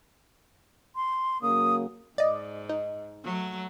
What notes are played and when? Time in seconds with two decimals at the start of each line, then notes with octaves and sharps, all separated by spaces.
0.96 C6
1.42 C#3 F#3 A#3 D#6
2.18 G#2 D5 D#5
2.69 D#4
3.24 F#3 A3